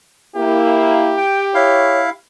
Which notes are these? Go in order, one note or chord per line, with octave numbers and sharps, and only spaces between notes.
A#3 E4 G4
G5
E4 C#5 F5